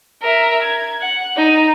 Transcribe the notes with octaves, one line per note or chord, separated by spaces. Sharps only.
A#4 E5
G#6
F#5
D#4 D#7